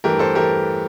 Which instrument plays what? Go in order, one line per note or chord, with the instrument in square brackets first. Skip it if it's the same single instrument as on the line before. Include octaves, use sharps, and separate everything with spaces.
[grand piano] G2 E3 A3 G4 A#4
A4 C5
E3 A3 G4 A#4